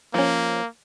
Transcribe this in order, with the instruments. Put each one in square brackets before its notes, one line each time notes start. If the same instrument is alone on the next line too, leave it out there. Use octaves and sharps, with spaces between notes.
[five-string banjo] F3 C#4 [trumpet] A#3